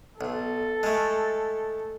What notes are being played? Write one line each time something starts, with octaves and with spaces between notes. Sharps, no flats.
B1 A4
G#3 A3